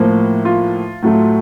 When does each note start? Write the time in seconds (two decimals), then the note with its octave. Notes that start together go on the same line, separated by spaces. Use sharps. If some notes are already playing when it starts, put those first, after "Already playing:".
Already playing: A2 F3 A#3
0.45 F4
1.03 A2 F#3 A3